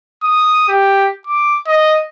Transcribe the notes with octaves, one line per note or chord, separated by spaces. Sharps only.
D#6
G4
D6
D#5